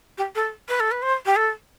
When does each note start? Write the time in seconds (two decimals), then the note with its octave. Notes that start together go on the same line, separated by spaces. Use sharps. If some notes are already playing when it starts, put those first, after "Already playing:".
0.18 G4
0.35 A4
0.69 B4
0.80 A4
0.91 B4
1.02 C5
1.26 G4
1.36 A4